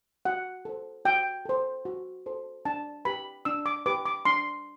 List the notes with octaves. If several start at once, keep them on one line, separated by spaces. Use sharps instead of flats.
F#4 F#5
A4 C5
F#4 G5
A4 C5
F#4
A4 C5
D4 A5
G4 B4 B5
D4 E6
D6
G4 B4 D6
D6
D4 C6